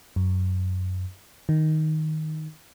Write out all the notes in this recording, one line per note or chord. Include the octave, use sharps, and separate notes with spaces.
F#2
D#3